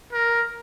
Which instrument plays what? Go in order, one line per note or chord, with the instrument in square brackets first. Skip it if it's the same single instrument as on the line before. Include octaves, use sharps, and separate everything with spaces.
[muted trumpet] A#4